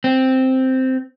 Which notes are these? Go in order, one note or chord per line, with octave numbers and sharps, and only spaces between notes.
C4